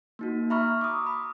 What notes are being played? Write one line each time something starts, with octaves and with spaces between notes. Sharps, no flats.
A#3 D#4 F#4
E5 A#5 B5 C#6 F6
D6 D#6
B5